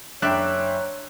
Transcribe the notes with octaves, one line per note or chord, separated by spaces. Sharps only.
F#1 D4 C#5 E5 G5 A#5 F#6